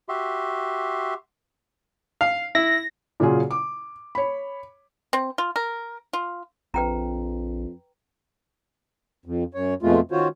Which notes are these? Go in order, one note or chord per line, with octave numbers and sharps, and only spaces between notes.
F#4 G4 E5 C6
F5
E4 A#6
A#2 C#3 F#3 F4 G#4
D6
C#5 B5
C4
F4
A#4
F4
A#1 F2 B4 G5 A#5
F2
F#2 C#5
F2 B2 G#3 A3 F4
D#3 C#4 F4 F#4 C5 C#5